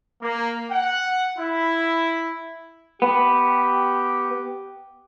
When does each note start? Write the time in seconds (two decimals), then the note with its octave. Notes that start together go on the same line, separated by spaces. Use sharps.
0.23 A#3
0.71 F#5
1.38 E4
3.02 B3 G4